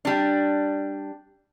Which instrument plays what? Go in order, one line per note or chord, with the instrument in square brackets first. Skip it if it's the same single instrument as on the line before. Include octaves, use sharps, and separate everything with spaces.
[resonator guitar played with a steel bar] G3 D4